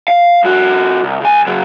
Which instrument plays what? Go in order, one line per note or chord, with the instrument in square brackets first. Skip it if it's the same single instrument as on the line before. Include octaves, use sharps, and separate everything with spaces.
[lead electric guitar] F5
F2 F#4
C2
C#2 G#5
C#3 F#3